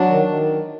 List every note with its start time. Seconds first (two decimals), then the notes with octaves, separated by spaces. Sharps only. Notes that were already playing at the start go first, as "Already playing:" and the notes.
Already playing: F#3 D4
0.09 D#3
0.26 D#3